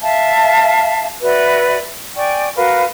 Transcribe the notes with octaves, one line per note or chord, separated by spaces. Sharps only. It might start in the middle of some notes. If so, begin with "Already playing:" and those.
E5 F5 A5
F#4 B4 D5 E5
D5 G5 G#5 C#6
F#4 A#4 B4 F5